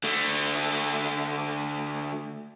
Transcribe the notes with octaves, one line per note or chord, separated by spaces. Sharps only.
D3 A3